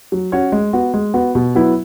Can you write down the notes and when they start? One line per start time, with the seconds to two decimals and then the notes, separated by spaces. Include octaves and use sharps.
0.12 F#3
0.32 C#4 F#4 C#5
0.52 G#3
0.73 B3 F#4
0.94 G#3
1.14 B3 F#4
1.35 B2
1.55 F#3 B3 E4